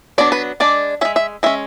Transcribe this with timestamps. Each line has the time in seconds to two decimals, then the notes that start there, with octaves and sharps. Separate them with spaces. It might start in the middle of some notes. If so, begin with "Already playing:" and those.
0.18 F#3 B3 D4 D5
0.32 B4
0.60 G#3 D4 D5
1.01 G#3 C#4 E5
1.16 E5
1.43 G#3 C#4 E5